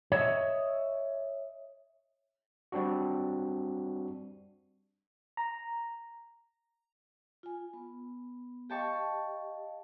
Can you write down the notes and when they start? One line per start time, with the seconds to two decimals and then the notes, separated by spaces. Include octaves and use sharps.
0.12 C#5 D#5 E5
2.72 G3 C4 D4 F#4
5.37 A#5
7.43 F4 G#5
7.73 B3
8.70 G4 D#5 F5 G5 A5 C#6